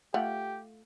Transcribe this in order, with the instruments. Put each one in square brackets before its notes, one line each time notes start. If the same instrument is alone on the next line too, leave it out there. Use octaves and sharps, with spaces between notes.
[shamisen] A3 F4 F#5 [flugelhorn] G4